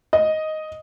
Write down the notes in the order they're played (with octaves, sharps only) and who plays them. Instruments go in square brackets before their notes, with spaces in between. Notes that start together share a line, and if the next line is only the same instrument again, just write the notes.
[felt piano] D#5